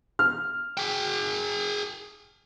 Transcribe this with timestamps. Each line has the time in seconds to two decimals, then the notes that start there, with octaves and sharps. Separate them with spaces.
0.19 F6
0.78 G#4 G5